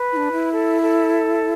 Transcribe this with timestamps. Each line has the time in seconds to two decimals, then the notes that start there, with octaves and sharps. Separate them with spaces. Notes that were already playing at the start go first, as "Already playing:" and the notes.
Already playing: B4
0.13 E4
0.17 D4
0.32 E4
0.52 A4
0.81 A4